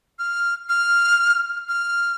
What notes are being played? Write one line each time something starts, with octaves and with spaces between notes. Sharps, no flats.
F6
F6
F6